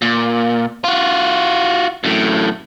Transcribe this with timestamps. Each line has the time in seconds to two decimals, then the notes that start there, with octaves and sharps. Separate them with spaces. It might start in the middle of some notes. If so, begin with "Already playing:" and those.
0.02 A#2
0.84 F4 F#4
2.04 F#2 A2